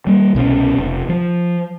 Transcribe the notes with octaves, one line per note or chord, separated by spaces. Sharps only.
G3 A#3
C2 B2 G3 C#4
F1
F3